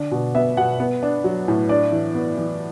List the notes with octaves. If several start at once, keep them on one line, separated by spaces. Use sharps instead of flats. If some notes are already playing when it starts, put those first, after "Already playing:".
Already playing: D3 D4 D5
B2
B3 E5
B2 F#5
B3
D4
F#3
A2
D4 D5
E3
B3
E3